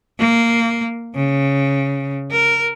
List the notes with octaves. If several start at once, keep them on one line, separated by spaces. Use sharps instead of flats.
A#3
C#3
A#4